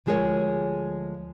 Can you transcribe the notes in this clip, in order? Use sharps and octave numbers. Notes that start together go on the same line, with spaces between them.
D2 F3 G#3 G#4 A#4 C#5